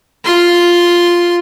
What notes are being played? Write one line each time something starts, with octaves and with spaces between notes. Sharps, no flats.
F4 C6